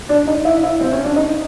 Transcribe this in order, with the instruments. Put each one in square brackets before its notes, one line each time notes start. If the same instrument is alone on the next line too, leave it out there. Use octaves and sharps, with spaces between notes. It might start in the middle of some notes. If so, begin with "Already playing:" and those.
[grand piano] D4 D5
D#4 D#5
E4 E5
E4 E5
C4 C5
C#4 C#5
D4 D5
D#4 D#5